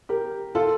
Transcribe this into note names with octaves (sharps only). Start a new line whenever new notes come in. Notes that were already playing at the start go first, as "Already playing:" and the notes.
G4 A#4
F4 A4